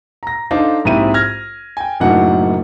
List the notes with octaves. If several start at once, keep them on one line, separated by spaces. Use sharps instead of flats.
A#5 A#6
D4 D#4 A4 C5 D#5 F5
A#1 G#2 C4 E4 G4 D#7
F6 G#6 A#6
G5 G#5
F#1 F#2 A2 D4 D#4 F#5